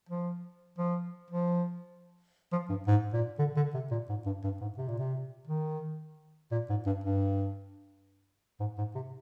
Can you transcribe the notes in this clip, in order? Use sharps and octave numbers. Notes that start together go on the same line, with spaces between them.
F3
F3
F3
F3
G2
G#2
A#2
D3
D3
C3
A#2
G#2
G2
G2
G#2
C3
A#2
C3
D#3
A#2
G#2
G2
G2
G#2
G#2
C3